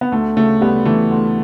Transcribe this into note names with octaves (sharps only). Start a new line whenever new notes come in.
B3
D2 A3
C#3 A3
D2 G3 B3
E3 A3
D2